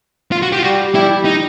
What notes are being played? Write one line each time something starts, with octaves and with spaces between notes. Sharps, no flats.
F4
F#4
G4
F4
G3 F#4
G3 E4
D#4